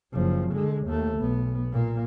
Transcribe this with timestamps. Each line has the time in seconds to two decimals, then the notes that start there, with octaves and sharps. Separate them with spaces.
0.13 F#1 F3
0.52 D3 G#3
0.86 D#2 A3
1.19 B1 B3
1.72 A#2 A#3